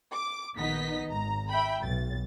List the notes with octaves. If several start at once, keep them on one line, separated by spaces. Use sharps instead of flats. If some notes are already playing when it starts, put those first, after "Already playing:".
D6
A#1 D#3 B3 D#4 D#5 B6
G#1 A#5
E5 G5 B5
B1 A6